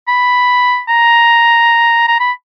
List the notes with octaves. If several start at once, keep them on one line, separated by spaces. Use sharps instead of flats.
B5
A#5
A#5
B5